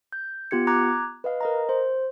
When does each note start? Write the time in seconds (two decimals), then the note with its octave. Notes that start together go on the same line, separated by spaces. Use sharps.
0.13 G6
0.51 B3 F4 G4 G#6 C#7
0.67 A#5 D6 F#6 G#6
1.24 B4 D#5 F5
1.41 A#4 D#5 A#5
1.69 C5